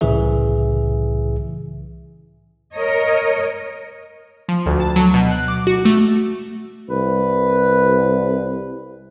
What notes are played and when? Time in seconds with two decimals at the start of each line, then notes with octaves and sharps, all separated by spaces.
0.01 C2 A2 C#3 E3 G#4 E5
2.75 A#4 C#5 D#5
4.49 F3
4.66 D2
4.80 A5
4.96 F#3
5.14 B2
5.31 F#6
5.48 D6
5.67 F#4
5.85 A3
6.90 C2 B4